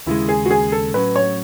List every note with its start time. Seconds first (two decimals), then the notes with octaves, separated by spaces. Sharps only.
0.06 D#2 C#3 G#3 E4
0.29 G#4
0.46 F#4
0.51 G#4
0.72 A4
0.94 A2 F#3 C#4 B4
1.16 C#5